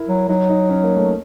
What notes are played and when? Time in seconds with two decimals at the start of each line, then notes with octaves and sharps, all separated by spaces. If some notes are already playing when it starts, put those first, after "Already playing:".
Already playing: E4 A#4
0.09 F#3
0.29 F#3 D#4
0.49 D#4
0.70 C#4
0.83 A#3
0.96 A3